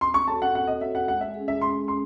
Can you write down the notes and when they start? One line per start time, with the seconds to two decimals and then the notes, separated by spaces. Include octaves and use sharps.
0.01 C4 C6
0.14 C#6
0.28 F#4 A4 C#5 A5
0.42 F#5
0.55 C4 F#5
0.67 D#5
0.81 F#4 A4 C#5 E5
0.95 F#5
1.08 G#3 F#5
1.21 E5
1.34 C#4 G#4
1.48 E5
1.61 G#3 C6
1.88 C#4 C6